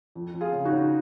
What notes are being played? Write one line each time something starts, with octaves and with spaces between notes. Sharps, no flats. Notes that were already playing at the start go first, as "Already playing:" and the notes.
F2
F2
F4 G#4
C#3
D#4 F#4
C#3